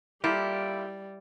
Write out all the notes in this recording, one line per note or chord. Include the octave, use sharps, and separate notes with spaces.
G3 A#3 E4 F4 G4 A4